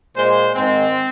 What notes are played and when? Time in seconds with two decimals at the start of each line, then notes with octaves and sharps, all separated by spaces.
0.16 A#2 G#3 C5
0.55 G#2 D#3 G#3 C4